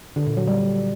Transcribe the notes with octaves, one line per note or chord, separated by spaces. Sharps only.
D3
A#2
F#3
G3